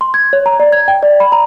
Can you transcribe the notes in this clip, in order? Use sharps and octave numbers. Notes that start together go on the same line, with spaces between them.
C6
G#6
C#5
A#5
D5
G#6
G5
D5
B5
A#5